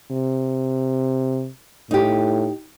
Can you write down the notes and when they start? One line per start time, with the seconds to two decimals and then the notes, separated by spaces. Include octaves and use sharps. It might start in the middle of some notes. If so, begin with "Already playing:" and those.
0.11 C3
1.91 A2 D#4 G4